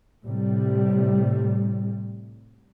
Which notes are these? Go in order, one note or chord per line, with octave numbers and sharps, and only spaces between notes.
A2 C3 G3